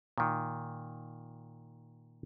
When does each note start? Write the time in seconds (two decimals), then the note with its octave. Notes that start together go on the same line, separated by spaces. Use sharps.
0.18 A#2 D#3